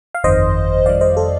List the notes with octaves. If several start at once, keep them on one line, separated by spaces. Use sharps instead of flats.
F5
G1 F2 D#3 C5 D#5
F2 D#3 G3 D5 F5
C5 D#5
A4 C5